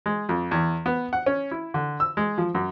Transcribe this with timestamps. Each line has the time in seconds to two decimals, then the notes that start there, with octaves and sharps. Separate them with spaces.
0.06 G#3
0.29 F2
0.51 E2
0.86 B3
1.13 F#5
1.26 C#4
1.51 E4
1.74 D3
2.00 E6
2.17 G#3
2.38 F3
2.55 F#2